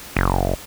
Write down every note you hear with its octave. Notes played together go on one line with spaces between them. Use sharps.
F#1